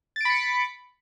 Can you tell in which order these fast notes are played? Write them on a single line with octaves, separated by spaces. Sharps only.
A6 D7 B5 C#7 B6